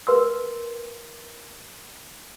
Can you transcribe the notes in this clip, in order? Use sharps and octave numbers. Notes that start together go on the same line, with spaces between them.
A#4 B4 C6 E6